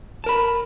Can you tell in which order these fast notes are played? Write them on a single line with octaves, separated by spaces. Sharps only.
A5 A#4 B5